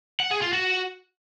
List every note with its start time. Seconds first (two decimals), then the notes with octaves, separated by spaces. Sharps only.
0.20 F#5
0.31 G#4
0.42 F4
0.53 F#4